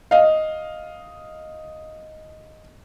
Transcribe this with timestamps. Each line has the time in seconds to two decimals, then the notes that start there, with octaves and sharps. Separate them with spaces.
0.11 D#5 F5